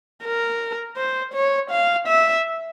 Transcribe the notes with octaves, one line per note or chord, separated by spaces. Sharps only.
A#4
C5
C#5
F5
E5